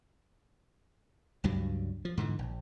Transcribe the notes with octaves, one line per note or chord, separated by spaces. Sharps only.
C#2 G2 F#3 G3
F3
G#2 D3 E3
A#1